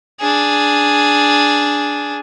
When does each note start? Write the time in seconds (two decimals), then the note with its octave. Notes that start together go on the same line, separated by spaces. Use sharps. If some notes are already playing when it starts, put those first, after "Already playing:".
0.20 D4 G#4